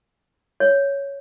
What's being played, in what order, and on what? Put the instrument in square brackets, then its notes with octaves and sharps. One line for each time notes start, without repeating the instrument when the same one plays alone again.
[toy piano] C#5